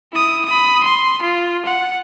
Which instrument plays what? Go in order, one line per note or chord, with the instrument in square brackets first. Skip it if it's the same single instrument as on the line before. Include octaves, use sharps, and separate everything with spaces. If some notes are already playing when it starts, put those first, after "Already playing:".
[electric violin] E4 D#6
B5 D#6
C6
F4
F#5